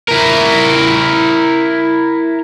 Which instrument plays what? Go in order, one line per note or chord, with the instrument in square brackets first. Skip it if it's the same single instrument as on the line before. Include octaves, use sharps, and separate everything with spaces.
[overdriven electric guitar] E4 A#4